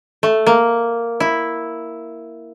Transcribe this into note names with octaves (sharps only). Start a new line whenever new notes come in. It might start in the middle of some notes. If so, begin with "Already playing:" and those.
A3
A#3
E4